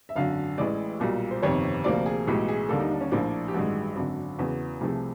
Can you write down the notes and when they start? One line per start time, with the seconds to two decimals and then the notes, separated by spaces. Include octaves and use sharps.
0.09 E5
0.16 G#1 F#2 D3 F5
0.58 A1 A2 E3 G#3 D5
1.00 B1 A#2 G3 A#3
1.31 C5
1.43 G1 F2 C3 D#3 C#5
1.84 D2 C3 F3 A#3 D5
2.06 G#4
2.27 B1 A2 E3 G#3 G4
2.49 G#4
2.69 D#2 D3 G3 A#3 A4
2.80 D#4
2.91 D4
3.01 C#4
3.11 A#1 A2 F3 A#3 D4
3.48 G4
3.54 A1 G2 D#3 G#3 F#4
3.96 G#1 F#2 D3
4.38 E2 C#3 E3 F#4
4.81 C2 C3 F3 A3 G#4